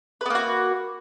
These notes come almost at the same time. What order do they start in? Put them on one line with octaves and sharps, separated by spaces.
B4 B3 A#3 F#4